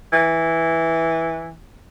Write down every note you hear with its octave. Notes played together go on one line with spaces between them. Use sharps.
E3